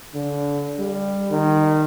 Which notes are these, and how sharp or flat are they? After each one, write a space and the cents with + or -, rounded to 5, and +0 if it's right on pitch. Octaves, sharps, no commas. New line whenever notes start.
D3 -30
G3 +15
D#3 -20